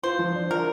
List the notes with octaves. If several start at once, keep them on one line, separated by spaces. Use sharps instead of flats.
F4 C5
F3
D4
F3 A#4